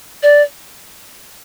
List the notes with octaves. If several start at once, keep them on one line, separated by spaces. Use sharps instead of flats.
D5